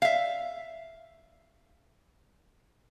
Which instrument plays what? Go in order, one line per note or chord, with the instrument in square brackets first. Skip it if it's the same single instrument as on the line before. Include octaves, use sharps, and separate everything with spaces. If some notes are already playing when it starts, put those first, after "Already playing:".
[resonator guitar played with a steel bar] E5 F5